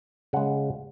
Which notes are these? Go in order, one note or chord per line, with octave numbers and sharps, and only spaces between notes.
C#3 G#3 F#5